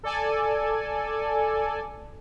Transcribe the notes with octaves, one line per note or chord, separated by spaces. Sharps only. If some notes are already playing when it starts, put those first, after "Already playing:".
A4 D5 G#5